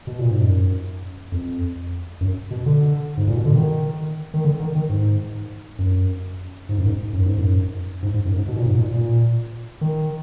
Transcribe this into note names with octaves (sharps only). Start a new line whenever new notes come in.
B2
A#2
G#2
F#2
F2
F#2
B2
D3
G#2
A#2
B2
D3
D#3
D#3
D3
D#3
D#3
G#2
F#2
G#2
F#2
G#2
F#2
G#2
F#2
G#2
G#2
F#2
G#2
B2
A#2
G#2
A#2
A#2
D#3